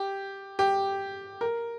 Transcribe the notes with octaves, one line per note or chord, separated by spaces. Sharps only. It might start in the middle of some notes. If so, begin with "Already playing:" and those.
Already playing: G4
G4
A#4